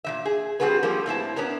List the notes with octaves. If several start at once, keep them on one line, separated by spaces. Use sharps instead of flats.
A#2 E3 E5
G#4
G3 G#3 C4 F#4 G#4 B4
F3 G3 A#3 A4
A2 C4 E4 A5
B3 C#4 D4 A#4